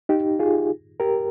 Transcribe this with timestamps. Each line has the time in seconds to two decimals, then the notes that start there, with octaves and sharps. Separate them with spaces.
0.09 D#4 G4
0.39 F4 G#4
1.00 G4 A#4